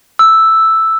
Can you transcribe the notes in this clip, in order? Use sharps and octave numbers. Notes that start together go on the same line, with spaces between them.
E6